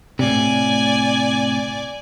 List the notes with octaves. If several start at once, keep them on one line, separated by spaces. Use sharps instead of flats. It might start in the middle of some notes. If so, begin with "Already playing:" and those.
A2 C3 D5 G#5